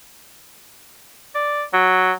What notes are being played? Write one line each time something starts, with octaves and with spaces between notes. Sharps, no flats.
D5
F#3